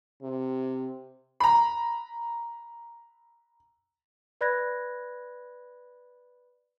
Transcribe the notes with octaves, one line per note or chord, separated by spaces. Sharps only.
C3
A#5 B5
B4 D5 B5 F#6 G#6 A#6